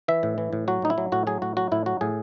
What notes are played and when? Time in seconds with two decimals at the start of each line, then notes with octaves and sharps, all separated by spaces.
0.08 E3 E5
0.23 A2
0.38 E3
0.53 A2
0.68 F#3 F#4
0.82 A2 D#4
0.90 E4
0.98 F#3
1.12 A2 F#4
1.27 F#3 G#4
1.42 A2 F#4
1.57 F#3 F#4
1.72 A2 E4
1.86 F#3 F#4
2.01 A2 G#4